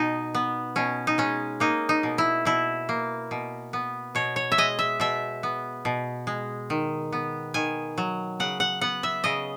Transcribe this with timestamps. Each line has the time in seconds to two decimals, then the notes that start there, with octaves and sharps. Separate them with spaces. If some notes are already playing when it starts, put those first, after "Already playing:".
Already playing: B2 D#4
0.35 B3
0.76 B2 C#4
1.07 D#4
1.18 G#3 C#4
1.60 A#3 D#4
1.89 D#4
2.03 B2
2.18 E4
2.45 B2 E4
2.89 A#3
3.31 B2
3.73 B3
4.15 B2 C#5
4.36 C#5
4.52 E5
4.58 G#3 D#5
4.79 E5
5.00 B2 E5
5.43 B3
5.85 B2
6.27 G#3
6.70 D#3
7.12 B3
7.54 D#3 G#5
7.98 F#3
8.40 C#3 F#5
8.60 F#5
8.81 B3 F#5
9.03 E5
9.24 C#3 D#5